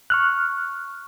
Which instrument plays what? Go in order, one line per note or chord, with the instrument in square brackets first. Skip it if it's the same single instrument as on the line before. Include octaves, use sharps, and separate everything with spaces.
[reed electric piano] C#6 F6 F#6